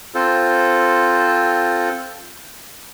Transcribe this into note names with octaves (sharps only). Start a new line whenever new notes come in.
C4 F4 A4 C5